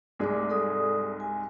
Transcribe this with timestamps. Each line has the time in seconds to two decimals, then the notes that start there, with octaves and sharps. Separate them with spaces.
0.20 C2 G#2 A3 G#4 D5 D6
0.49 A4 D5 D#6
1.20 G#5